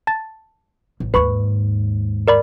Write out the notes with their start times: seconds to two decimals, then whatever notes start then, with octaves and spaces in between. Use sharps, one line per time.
0.07 A5 A6
1.00 A1
1.14 D#2 G#2 B4 B5 C#6
2.28 A#4 D5 B5